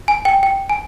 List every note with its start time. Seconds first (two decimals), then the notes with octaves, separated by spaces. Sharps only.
0.08 G#5
0.25 G5
0.43 G5
0.70 G#5